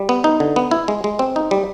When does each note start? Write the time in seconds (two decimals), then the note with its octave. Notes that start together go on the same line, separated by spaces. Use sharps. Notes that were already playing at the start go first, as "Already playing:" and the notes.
Already playing: G3
0.09 B3
0.24 D#4
0.40 D3
0.56 B3
0.71 E4
0.88 G#3
1.04 G#3
1.19 C4
1.36 D#4
1.51 G3